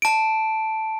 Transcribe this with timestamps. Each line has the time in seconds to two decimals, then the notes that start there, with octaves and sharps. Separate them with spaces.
0.02 A5 D7